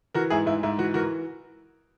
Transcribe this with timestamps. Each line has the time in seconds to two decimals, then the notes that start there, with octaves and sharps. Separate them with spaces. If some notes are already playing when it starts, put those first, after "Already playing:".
0.14 E3 F#4 A#4
0.30 G#2 E4 G#4
0.46 G#2 E4
0.63 G#2 E4
0.78 E3 F#4
0.94 E3 F#4 A#4